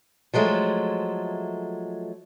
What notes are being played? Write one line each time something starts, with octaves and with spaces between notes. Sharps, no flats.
F3 F#3 G#3 A3